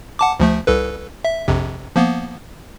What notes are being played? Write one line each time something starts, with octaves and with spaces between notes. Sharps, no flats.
F#5 A5 D6
D2 F3 A3
C2 A4 B4
E5
A#1 F2 C3
F3 A#3 B3